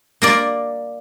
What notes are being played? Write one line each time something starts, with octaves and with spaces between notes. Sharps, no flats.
A#3 A#4 D5